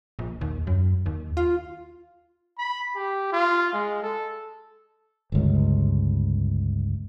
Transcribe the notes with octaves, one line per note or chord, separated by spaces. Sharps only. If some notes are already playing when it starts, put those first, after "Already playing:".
A#1
D#2
F#2
D#2
F4
B5
G4
F4
G#3
A4
G1 C#2